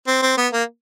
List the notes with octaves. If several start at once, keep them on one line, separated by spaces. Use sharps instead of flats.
C4
C4
B3
A#3